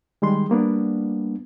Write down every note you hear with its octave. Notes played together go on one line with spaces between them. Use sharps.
D#3 G3 G#3 C6
G3 A#3 B3 D4